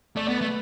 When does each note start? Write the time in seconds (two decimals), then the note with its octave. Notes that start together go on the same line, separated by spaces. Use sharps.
0.16 A3 D5
0.27 B3 D5
0.37 A3 B4